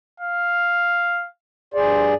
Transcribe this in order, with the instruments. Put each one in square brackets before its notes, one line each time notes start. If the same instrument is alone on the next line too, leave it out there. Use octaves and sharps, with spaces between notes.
[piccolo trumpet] F5
[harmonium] G2 G#4 D5 [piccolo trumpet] C5